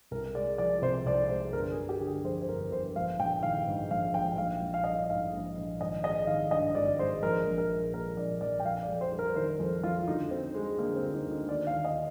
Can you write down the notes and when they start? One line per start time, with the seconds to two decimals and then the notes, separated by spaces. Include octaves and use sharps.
0.11 C2 A#4
0.34 G#3 D5
0.58 F3 D5
0.82 C3 C5
1.05 C2 D5
1.30 G#3 C5
1.53 G1 A#4
1.71 G#4
1.77 G1
1.89 G4
2.00 D3
2.07 G#4
2.24 F2 C5
2.42 C5
2.49 G1 A#4
2.72 G1 C5
2.96 A#1 F5
3.19 A#1 G5
3.43 D#3 F5
3.67 G#2
3.91 A#1 F5
4.14 A#1 G5
4.38 A#1 F5
4.62 A#1
4.74 F5
4.84 G3 D#5
4.93 F5
5.09 G#2 F5
5.33 A#1
5.57 A#1
5.80 G#1 D#5
6.04 G#3 D#5
6.27 D#3 F5
6.51 G2 D#5
6.75 G#1 D5
6.99 G#3 C5
7.22 A#1 A#4
7.47 A#1
7.58 A#4
7.70 G#3
7.93 A#2 A#4
8.17 A#1 D5
8.41 A#1 D5
8.60 G5
8.65 F2 F5
8.83 D5
8.88 F2
9.01 C5
9.12 G3
9.19 A#4
9.36 D#3 C5
9.60 F2
9.83 F2 F4
10.08 D2 D#4
10.31 D2 C4
10.54 G3 G#3
10.78 D3 A#3
10.96 C4
11.02 D2
11.14 D#4
11.26 D2
11.31 D#4
11.49 D#2 D5
11.67 F5
11.73 D#2
11.85 D#5